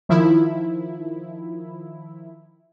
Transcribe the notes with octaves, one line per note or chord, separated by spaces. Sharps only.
D#3 F3 E4